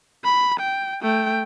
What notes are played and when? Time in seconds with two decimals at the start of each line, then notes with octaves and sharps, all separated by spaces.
0.24 B5
0.60 G5
1.03 A3 G5